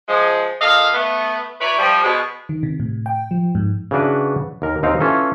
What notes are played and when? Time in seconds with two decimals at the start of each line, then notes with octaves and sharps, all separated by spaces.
0.08 F3 G#3
0.61 A#2 A4 D#5 F5
0.93 A3 B3
1.60 F#3 E4 B4 C#5 D5
1.78 F3 G3
2.03 B2 G#3
2.49 D#3
2.63 C3
2.80 A2
3.06 G5
3.31 F3
3.55 G#2
3.91 C#3 E3 D4 F#4 B4
4.62 D#2 A#4
4.83 D#2 C4 D#4 F5
5.00 E3 C#4 F4 A4